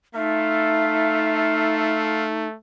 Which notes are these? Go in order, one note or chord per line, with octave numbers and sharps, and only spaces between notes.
A3 D#4 F4 A4 E5 F5